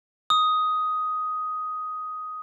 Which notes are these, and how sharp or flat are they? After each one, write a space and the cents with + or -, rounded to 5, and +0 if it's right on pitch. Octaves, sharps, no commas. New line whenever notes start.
D#6 +10